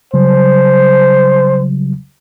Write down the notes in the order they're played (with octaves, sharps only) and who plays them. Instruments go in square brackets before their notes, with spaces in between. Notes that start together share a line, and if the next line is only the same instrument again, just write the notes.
[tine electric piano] C#3 F#3 G3 [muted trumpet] C5